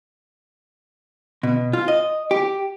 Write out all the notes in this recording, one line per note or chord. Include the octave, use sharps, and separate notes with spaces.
B2
F4
D#5
G4